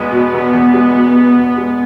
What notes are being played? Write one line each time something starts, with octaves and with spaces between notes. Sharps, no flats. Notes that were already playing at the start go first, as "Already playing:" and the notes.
Already playing: E1 E2 B2 G#3 B3
B2
E1
E2
G#3
B2
E1
E2
G#3